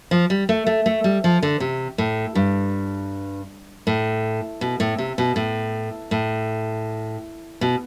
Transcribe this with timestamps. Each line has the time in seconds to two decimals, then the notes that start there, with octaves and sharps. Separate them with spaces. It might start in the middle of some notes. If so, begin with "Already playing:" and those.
0.11 F3
0.30 G3
0.49 A3
0.67 A3
0.86 A3
1.04 G3
1.24 F3
1.42 D3
1.60 C3
1.98 A2
2.35 G2
3.87 A2
4.61 B2
4.80 A2
4.98 C3
5.18 B2
5.36 A2
6.11 A2
7.61 B2